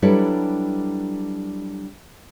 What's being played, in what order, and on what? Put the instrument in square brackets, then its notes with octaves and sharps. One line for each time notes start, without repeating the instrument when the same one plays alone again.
[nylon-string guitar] F#3 G3 D4 E4 A4 B4